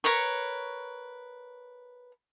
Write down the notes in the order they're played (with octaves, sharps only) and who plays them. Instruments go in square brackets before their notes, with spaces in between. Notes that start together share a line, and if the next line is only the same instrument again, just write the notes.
[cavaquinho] A#4 B4 C#5 C#6